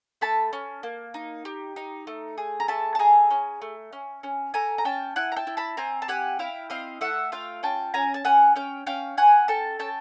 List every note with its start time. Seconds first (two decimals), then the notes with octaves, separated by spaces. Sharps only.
0.21 A3 A5 B5
0.53 C#4
0.83 A#3
1.14 D#4
1.45 G4
1.76 D#4
2.07 A3
2.38 G#4
2.60 A#5
2.68 A3 A5 B5
2.95 A5
2.99 G#4 G#5 A#5
3.31 C#4
3.62 A3
3.93 C#4
4.23 C#4
4.54 A3 G#5 A#5
4.78 A#5
4.85 C#4 G5 A5
5.16 E4 F#5 G#5
5.32 A#5
5.36 G5 A5
5.47 E4
5.57 A5 B5
5.77 C4 G#5 A#5
6.02 A5
6.08 G4 F#5 G#5
6.39 E4 F5 G5
6.70 C4 D#5 F5
7.01 A3 E5 F#5
7.32 F4 F5 G5
7.63 C#4 G5 A5
7.94 C#4 G#5 A#5
8.14 A5
8.25 C#4 F#5 G#5
8.56 C#4 F5 G5
8.87 C#4 F5 G5
9.17 C#4 F#5 G#5
9.48 A4 G5 A5
9.79 C#4 G5 A5